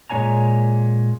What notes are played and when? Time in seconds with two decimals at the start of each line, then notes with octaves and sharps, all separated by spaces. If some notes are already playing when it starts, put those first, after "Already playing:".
0.10 A#2 G#3 D4 C#5 G#5 A#5